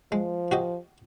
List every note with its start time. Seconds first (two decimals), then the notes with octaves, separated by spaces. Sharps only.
0.12 F3 G#3
0.51 F#4 G4 D#5